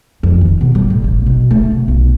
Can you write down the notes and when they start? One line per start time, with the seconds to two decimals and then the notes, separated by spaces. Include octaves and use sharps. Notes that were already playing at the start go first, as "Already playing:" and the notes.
0.23 F2
0.41 D#3
0.61 B2
0.75 G3
0.90 A2
1.04 A1
1.26 B2
1.51 A3
1.71 B2
1.88 B1